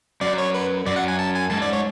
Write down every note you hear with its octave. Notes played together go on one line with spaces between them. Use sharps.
F#2 D5
C#5
B4
F#2 D5
F#5
G#5
A5
G#5
G#2 A5
D5
C#5